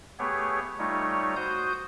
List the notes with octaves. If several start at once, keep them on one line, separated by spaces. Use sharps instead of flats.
A3 B3 G4 G#4 C#5
G3 A3 D#4 F4 C#5
F#4 C5 D#6 G6